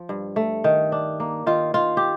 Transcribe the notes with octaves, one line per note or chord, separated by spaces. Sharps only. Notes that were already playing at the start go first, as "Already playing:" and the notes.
Already playing: F3
G2
A3
D#3
D4
A#3
D#3 F4
D#3 F4
G4